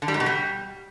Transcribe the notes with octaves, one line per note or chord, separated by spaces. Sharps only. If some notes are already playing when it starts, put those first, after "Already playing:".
D3
G3
G#2
B2
G3